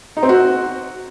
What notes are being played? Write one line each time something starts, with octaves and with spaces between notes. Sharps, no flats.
D#4
C4
F#4